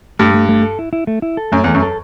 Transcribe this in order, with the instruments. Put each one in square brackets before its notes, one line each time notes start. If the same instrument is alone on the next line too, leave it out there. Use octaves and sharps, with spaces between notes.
[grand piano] G2 [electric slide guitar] A3
[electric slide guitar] A3
A3
A4
E4
E4
A3
E4
A4
[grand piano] F#2 [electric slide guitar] A3
[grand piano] E2
[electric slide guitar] A3
[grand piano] F#2
[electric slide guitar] A4